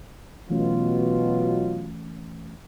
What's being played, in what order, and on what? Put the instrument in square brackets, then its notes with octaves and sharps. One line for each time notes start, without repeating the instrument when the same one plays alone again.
[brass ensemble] B2 [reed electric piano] E3 A3 C#4 [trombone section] F#3 F4